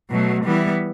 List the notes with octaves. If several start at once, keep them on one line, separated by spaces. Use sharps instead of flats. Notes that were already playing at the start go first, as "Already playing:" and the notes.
B2 F#3 A3
E3 G3 B3 E4